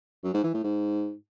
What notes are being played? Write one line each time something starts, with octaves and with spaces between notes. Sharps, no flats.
F#2
G#2
E3
A2
G#2